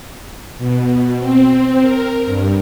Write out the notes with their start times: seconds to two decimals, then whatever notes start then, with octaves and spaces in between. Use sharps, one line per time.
0.58 B2
1.19 C4
1.82 A#4
2.25 G2